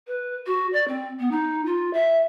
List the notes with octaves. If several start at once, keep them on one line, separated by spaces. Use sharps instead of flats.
B4
F#4
D5
C4
B3
D#4
F4
E5